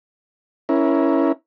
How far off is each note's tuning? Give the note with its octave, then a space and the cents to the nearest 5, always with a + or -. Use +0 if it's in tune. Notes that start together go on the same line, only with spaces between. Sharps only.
C#4 +0 E4 +0 A#4 +15